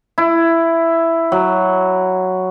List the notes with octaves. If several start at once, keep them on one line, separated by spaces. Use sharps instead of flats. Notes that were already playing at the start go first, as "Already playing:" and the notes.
E4
F#3